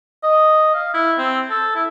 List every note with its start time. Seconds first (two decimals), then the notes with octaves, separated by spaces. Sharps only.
0.23 D#5
0.74 F5
0.94 E4
1.18 C4
1.50 A4
1.75 E4